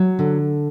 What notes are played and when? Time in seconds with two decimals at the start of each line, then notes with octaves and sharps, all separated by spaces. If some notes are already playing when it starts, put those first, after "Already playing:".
Already playing: F#3
0.19 D3